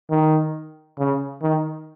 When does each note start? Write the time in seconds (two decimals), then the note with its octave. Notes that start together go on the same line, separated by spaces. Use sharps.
0.10 D#3
0.98 C#3
1.42 D#3